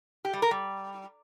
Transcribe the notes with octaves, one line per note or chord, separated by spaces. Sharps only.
G4
G3
A#4
G3